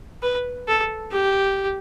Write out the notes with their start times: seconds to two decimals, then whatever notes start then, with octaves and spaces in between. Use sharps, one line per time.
0.22 B4
0.68 A4
1.12 G4